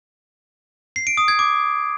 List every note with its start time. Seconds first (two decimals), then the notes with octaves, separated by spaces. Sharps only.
0.96 C7
1.07 D7
1.17 D#6
1.28 G#6
1.39 D6